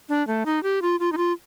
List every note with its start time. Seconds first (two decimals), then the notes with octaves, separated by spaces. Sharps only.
0.09 D4
0.27 A3
0.46 D#4
0.63 G4
0.82 F4
1.00 F4
1.12 D#4
1.17 F4